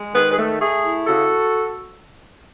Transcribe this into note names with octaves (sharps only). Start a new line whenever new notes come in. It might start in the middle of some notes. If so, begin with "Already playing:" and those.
Already playing: G#3
D#3 G#4 B4
G#4 B4
A3
A3 G#4
E4
C#3 F#4 A4